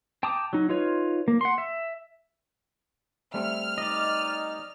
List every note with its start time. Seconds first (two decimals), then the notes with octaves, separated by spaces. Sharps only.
0.23 G5 A5 A#5 D6 D#6
0.53 F#3 D#4
0.69 D#4 F4 B4 C#5
1.28 A#3
1.41 F#5 C6
1.58 E5
3.34 G3 A3 C4 E5 F6
3.78 D#4 D5 D#5